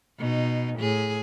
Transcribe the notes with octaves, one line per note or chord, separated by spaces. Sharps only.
B2 D#4
A2 G#4